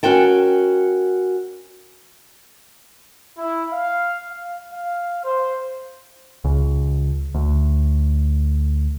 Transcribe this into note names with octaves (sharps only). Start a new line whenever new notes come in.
C#4 F#4 A#4 G5 A5
E4
F5
F5
F5
C5
C#2
D2